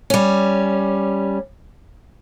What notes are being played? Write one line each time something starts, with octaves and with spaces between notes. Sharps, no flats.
G3 C#4